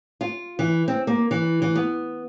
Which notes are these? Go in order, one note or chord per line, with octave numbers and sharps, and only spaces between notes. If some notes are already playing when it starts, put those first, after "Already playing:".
F4
E3
C4
A#3
E3
E3
B3